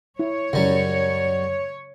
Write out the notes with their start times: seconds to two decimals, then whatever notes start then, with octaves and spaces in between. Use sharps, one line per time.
0.19 E4 C#5
0.53 F#2 C#3 F#3 G3